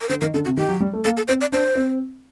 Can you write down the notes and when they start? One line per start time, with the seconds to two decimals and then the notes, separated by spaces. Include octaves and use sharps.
0.01 A#4
0.09 D3 C5
0.21 D#3 A#4
0.34 D3 A4
0.45 C3 F#4
0.57 D#3 G4
0.69 F#3
0.80 G3
0.93 A3
1.05 A#3 A4
1.17 A4
1.28 C4 C5
1.41 D5
1.52 D4 C5
1.75 C4